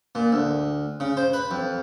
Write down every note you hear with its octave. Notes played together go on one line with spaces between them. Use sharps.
A#2
D2
C#3
C5
B4
F2